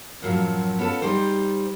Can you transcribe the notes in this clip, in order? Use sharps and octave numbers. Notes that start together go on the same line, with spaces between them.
F#2 A2 F3 F#3
B3 C#4 F4 A4
G3 D#4 G4 C5